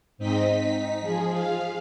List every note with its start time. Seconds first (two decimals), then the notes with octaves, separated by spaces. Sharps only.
0.18 G#2 C4 D#4 D#5 B6
0.55 D#4 B6
1.01 F3 G#4
1.33 F5